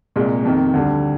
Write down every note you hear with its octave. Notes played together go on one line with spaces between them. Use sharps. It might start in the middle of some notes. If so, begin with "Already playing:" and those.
C2 A#2 G#3
F2 C3 D#3
D2 D3 G3